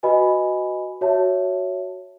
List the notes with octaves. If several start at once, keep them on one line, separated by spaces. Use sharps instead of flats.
F#4 B4 D#5 G#5 B5
F#4 C#5 E5 A5